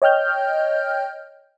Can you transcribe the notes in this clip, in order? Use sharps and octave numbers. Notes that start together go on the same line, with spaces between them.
C#5 D#5 G5 F6 G6